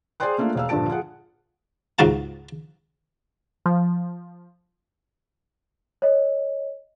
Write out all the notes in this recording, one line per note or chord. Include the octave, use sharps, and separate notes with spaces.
G#4 C5 D5 G5 C6 F#6
A3 A#3 D4 F4
E1 F5 E6
D#1 G2 D3 F3 A5 D7
F4 G#4 F#5
C#2 G#2 D#4 F#4 F5 A5
F3
C#5 D#5